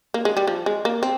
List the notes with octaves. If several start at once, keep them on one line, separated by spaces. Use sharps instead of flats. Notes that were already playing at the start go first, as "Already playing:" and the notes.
A#3
G#3
G3
F3
G#3
A#3
C4